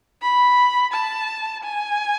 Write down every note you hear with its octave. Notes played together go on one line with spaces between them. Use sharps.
B5
A5
G#5